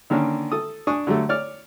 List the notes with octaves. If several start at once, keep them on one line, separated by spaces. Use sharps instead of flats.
D3 D#3 A#3 C#4 D4
A4 D#6
D4 G#5 C#6 D#6
D3 F#3 G3 A3
C#5 D5 F6